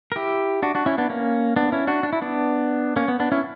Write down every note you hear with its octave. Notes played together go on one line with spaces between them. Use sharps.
A#4
E4 G4
D4 F#4
D4 F#4
C#4 E4
B3 D4
A#3 C#4
B3 D4
C#4 E4
D4 F#4
D4
E4
B3 D4
A#3 C#4
B3
B3 D4
C#4 E4